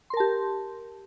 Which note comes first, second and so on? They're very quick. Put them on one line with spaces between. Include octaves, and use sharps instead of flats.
C6 A#4 A5 G4